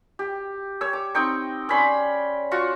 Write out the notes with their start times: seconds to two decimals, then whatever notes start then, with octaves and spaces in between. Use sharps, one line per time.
0.19 G4
0.81 C#5 E6
0.93 D6
1.15 C4 D#4 G5 C#6
1.69 C#4 D5 B5 C6
2.51 F4 F#4 C#6